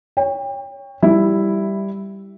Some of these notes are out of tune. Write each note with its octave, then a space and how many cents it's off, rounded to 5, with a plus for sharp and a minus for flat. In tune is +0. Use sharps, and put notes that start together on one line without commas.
C#5 +5 G5 +30
G3 +0 E4 +0